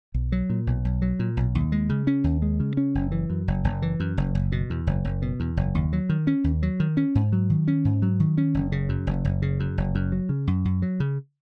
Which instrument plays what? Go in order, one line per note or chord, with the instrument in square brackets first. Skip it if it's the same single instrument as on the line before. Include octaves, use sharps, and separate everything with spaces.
[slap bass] B1
F#3
A#2
B1
B1
F#3
A#2
B1
D#2
G#3
C#3
C#4
D#2
G#3
C#3
C#4
F#1
E3
F#2
F#1
F#1
E3
F#2
F#1
F#1
B2
E2
F#1
F#1
B2
E2
F#1
D#2
F#3
D#3
C#4
D#2
F#3
D#3
C#4
G#2
F#3
D#3
C#4
G#2
F#3
D#3
C#4
F#1
C#3
F#2
F#1
F#1
C#3
F#2
F#1
F#2
F#3
C#3
F#2
F#2
F#3
C#3